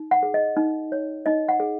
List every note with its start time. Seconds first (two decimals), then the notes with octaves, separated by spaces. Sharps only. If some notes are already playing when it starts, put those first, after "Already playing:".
Already playing: D#4
0.11 F#5
0.23 G#4
0.34 D#5
0.57 D#4
0.92 C#5
1.26 D#4 D#5
1.49 F#5
1.60 G#4